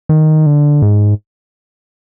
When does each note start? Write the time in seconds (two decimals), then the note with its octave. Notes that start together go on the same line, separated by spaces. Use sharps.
0.09 D#3
0.46 D3
0.82 G#2